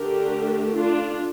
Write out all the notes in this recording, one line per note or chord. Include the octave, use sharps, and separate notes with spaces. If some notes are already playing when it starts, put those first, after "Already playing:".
Already playing: D3 A3 D4 G4 A#4
D4 F4